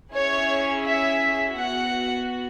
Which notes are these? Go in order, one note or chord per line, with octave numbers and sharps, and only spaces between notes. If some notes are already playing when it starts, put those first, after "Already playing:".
C#4 E4 G#4 C#5
E5
B3 F#4 F#5